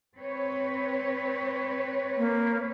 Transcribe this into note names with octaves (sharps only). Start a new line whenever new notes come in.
C4 B4 C#5
A#3